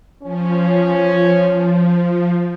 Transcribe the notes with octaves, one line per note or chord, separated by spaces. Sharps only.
F3 C#4